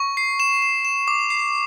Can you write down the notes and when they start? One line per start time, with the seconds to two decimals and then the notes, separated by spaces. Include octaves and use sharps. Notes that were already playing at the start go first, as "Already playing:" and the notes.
Already playing: C#6
0.17 C7
0.40 E7
0.62 E7
0.85 E7
1.08 D6
1.30 C7